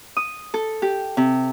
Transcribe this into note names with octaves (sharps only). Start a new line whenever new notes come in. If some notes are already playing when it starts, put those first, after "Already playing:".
D#6
A4
G4
C3